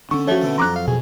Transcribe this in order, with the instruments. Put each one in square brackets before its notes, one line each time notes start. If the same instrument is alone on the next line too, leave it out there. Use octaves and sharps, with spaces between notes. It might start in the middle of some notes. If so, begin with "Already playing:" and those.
[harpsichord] D3 [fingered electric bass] C#4 D4 [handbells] C#6
[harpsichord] F3 [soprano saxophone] A3 [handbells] F#4 C#5
[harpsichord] B2 D3
[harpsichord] F2 F#3 [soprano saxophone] A#5 [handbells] C6 D6 F#6
[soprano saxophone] F5
[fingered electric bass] B2 [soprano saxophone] G#4